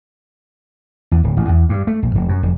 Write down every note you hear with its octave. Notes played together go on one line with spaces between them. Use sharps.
E2
D1
A1
E2
G2
A3
A#1
F1
F#2
F1